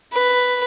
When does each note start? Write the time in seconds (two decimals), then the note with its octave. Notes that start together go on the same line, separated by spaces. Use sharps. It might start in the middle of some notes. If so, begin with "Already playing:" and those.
0.13 B4